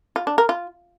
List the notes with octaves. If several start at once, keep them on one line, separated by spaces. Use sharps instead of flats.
F4
D4
A#4
F4